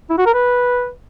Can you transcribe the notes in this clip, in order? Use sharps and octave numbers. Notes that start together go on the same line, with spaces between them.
E4
F#4
A#4
B4